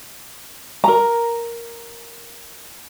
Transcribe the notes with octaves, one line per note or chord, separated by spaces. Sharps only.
A#4 A#5